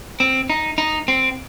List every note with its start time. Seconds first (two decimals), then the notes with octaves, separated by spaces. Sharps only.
0.20 C4
0.50 D#4
0.78 D#4
1.08 C4